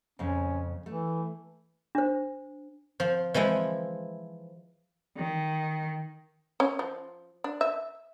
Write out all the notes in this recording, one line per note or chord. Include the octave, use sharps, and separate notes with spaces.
F2 A#2 C#3 C#4
E3 A3
D4 C5
F3
E3 F3 G#3 E4
D#3
C#4
F3
D4
E5